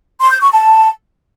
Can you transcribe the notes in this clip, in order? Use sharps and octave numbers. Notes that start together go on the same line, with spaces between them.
C6
G6
C#6
A5